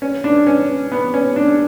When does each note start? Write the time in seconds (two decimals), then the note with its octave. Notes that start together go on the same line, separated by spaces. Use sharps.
0.02 C#4
0.24 D4
0.47 C#4
0.92 B3
1.14 C#4
1.36 D4